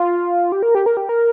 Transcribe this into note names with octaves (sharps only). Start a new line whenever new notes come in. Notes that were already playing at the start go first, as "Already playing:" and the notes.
Already playing: F4
G4
A#4
G4
A#4
G4
A#4